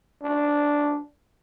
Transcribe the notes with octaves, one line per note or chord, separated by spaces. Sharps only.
D4